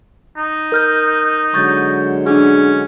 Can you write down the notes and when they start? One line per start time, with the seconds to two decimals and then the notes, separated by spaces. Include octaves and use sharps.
0.37 D#4
0.72 A#4 F6 G6
1.54 D3 F#3 G#3 C#6 G6 A6
2.26 C#4 D4 G#4